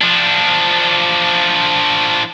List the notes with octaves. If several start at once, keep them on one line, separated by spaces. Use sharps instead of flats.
F3 D4